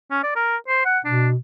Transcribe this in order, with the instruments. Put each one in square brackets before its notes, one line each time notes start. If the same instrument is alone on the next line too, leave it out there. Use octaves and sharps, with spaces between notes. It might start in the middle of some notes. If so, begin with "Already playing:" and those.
[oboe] C#4
D5
A#4
C5
F#5
[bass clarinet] B2 [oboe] D4